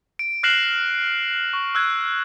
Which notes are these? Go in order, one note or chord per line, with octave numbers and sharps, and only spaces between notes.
D7
F6 F#6 A#6 C7 E7 F#7
C#6
E6 F#6 G#6